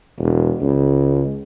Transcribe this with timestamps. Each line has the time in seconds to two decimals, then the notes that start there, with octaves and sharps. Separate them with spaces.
0.18 E1
0.61 C#2